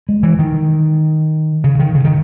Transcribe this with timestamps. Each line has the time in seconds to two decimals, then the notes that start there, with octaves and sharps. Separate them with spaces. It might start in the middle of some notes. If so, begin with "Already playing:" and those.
0.09 G#3
0.23 E3
0.39 D#3
1.64 C#3
1.79 D#3
1.95 C#3
2.05 D#3